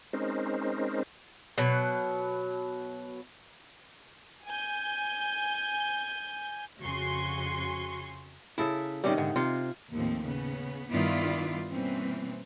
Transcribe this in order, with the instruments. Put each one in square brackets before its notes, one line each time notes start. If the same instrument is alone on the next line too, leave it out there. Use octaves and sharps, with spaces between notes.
[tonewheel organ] G#3 C4 C#4 D#4 A#4 C5
[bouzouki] B2 F#3
[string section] G#5 G6
F2 C#3 F#4 G#5 C6 C#6
[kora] C#3 A4 A#4 [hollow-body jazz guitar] E4
[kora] C3 D#3 [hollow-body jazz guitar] G3 C4 C#4
[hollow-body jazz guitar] G#2 D3
[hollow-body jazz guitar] C3 [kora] F4
[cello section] D#2 A2 F3 C4
C#3 B3
G2 D#3 B3 E4 F4 D5
B2 E3 G3 A#3 C4 C#4